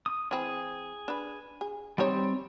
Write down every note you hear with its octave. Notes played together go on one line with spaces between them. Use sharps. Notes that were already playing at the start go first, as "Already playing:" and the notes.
D#6
E3 C4 G#4
D4 B4
G#4
G3 C4 D#4 G4 C#5